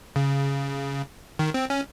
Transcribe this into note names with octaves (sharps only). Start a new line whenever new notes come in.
C#3
D#3
C4
C#4